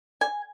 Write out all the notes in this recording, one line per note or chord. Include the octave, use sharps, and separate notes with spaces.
G#5